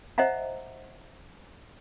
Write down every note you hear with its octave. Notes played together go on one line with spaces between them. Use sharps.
C5 D#5 E5 F#5 A#5